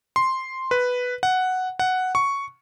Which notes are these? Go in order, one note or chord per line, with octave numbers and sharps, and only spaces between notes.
C6
B4
F#5
F#5
C#6